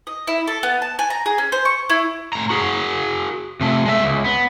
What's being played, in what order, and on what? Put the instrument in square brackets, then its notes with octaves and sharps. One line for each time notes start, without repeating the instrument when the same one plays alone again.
[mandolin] D#5
E4
A4
B3
A5
G#5
A#5
G#4
C#4
C5
C#6
E4
[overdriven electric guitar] A2 A#5
F#4 G#4
C3 A3
G#3 E5
C#2
B3